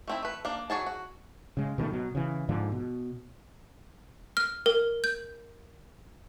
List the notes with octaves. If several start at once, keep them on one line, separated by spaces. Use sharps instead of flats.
A3 C4 E4
A3 B4
A#3 D4
F#3 F#4 G#4 A5
F#4
C#3 G#3
B2 D#3 F3 A3
B2 F#3
C#3 E3
G#2 D3 F3
B2
F6
A#4
G6